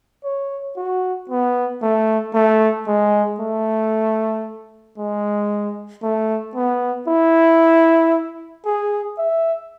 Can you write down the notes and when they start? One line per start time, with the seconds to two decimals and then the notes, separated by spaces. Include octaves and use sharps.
0.24 C#5
0.77 F#4
1.29 B3
1.82 A3
2.34 A3
2.87 G#3
3.40 A3
4.98 G#3
6.03 A3
6.55 B3
7.08 E4
8.66 G#4
9.18 E5